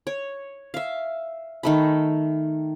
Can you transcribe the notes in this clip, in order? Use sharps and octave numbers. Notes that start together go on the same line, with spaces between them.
C#5
E5 F5
D#3 A3 B5